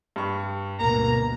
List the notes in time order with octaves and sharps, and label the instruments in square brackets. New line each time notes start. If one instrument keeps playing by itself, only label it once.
[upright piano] G2 C#6
[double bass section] D2 G2 B2 [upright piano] A#3 [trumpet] A#5